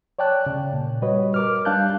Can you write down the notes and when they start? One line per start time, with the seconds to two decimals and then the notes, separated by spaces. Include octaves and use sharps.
0.19 C#5 D5 G5 A5 F#6
0.46 C#3
0.73 A#2
1.02 G3 F#4 B4 C#5 D#5
1.34 A#4 D6 F6
1.65 G3 D4 F5 A5 F#6 G6